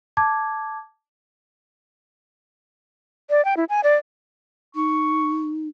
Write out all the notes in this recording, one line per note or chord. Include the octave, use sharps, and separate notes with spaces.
A5 D6 G#6
D5
G5
E4
G#5
D5
D#4 C#6